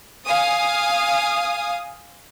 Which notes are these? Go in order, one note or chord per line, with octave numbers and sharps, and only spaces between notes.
F5 G#5 D#6